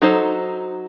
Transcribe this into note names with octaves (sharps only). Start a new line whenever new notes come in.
F#3 D#4 A4 C5